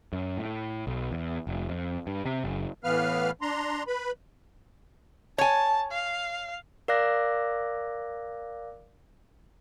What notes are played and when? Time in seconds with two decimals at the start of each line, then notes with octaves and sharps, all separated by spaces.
0.13 F#2
0.37 A2
0.87 B1
1.12 E2
1.47 F1
1.69 F2
2.07 G2
2.26 C3
2.44 F#1
2.84 A2 E3 B3 B4 F5 F6
3.41 D4 A#5 C6
3.87 B4 B5
5.38 C#5 G#5 A5
5.91 F5
6.88 A#4 D5 F5 D6 F#6 A#6